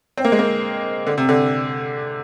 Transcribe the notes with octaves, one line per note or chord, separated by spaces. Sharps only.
C4
A#3
G#3
A#3
D3
C3
D3